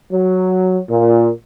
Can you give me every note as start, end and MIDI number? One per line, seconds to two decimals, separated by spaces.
0.11 0.79 54
0.89 1.30 46